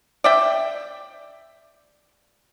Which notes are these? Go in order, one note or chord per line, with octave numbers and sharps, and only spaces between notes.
D5 E5 G5